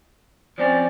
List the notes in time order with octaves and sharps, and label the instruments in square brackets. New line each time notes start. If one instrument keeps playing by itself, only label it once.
[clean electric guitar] F3 C4 C#4 [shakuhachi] D5